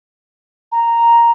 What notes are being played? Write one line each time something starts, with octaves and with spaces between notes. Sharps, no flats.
A#5